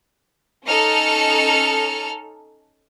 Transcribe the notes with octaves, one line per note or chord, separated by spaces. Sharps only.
C#4 D#4 A4 F6 C#7